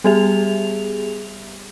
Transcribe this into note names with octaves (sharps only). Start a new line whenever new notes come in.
G3 B3 G4 G#4 E5 F7